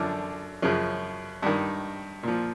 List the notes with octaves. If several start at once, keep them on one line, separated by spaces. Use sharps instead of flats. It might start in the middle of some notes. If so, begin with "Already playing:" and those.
Already playing: F#2 D3 F3 D4
F#2 C#3 F3
G2 D#3
A#2 F3